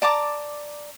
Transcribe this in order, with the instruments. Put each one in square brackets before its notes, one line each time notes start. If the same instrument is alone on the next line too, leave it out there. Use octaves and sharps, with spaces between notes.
[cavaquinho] D5 A5 A#5 D6